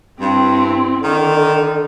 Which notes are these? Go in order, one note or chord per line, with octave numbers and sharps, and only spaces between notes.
G2 C4 E4
D3 D#3